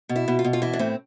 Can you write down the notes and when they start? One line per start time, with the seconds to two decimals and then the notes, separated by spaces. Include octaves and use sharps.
0.09 B2
0.16 E4
0.28 B2
0.39 F4
0.44 B2
0.53 F4
0.62 E3 E4
0.73 D4
0.79 A2 C4